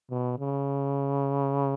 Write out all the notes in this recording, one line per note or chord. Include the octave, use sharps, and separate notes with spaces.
B2
C#3